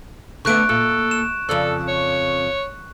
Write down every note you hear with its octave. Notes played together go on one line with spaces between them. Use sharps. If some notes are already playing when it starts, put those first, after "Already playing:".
D3 A3 B3 C#6 F#6 D7
A#2 A4
E7
F2 C#3 A4 D5
C#5